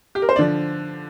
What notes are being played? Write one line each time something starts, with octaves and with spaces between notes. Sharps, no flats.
G4
A#4
C5
D5
D3 F3